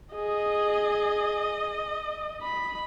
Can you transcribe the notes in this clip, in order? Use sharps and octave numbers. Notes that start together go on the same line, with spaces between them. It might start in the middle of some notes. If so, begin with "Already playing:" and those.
G#4 D#5
B5